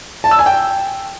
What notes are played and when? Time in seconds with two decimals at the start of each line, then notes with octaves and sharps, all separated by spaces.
0.24 A5
0.31 E6
0.39 G#5
0.46 G5